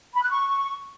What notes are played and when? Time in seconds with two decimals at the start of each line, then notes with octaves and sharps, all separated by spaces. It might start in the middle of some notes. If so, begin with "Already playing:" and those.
0.14 B5
0.22 F#6
0.30 C#6